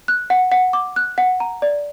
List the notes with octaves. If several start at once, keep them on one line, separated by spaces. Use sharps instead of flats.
F#6
F#5
F#5
D6
F#6
F#5
A#5
D5